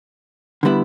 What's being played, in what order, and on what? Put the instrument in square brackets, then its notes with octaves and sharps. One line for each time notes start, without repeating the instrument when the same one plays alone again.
[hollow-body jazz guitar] D3 G3 B3 E4